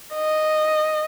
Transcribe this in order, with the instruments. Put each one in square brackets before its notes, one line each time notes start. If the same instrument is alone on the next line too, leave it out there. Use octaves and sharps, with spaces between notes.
[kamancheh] D#5